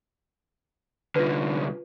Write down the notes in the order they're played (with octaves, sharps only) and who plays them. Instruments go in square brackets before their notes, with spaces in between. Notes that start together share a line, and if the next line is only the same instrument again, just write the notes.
[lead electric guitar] C2 D3 [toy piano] F4 B4